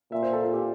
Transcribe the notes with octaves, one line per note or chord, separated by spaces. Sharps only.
A#2 E5
C5
A4
F4
G4